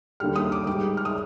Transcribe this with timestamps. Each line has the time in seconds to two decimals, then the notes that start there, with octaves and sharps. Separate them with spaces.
0.20 D#2 D3 G3 F6
0.36 D#6
0.52 D6
0.67 G#2 G3 D6
0.97 F6
1.05 D#6